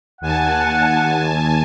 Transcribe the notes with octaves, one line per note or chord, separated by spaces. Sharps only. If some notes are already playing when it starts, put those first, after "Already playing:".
D#2 F#5 G#5 A5